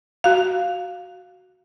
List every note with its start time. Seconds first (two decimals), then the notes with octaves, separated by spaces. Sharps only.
0.24 F#4 F5